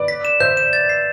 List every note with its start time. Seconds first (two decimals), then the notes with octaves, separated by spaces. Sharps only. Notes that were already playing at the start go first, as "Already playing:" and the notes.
Already playing: B4 D5
0.08 B6
0.25 E7
0.40 C5 E5 G6
0.57 E7
0.73 A6
0.89 C7